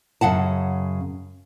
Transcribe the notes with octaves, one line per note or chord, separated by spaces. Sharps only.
F#2 C#3 F#5 A5